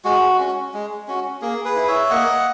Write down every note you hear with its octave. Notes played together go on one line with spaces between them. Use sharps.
G#3 F#4
C#4 F#4
G#3
C#4 F#4
A#3 G#4
G#4 B4
E4
C#5 E5
A#3 D#5 F#5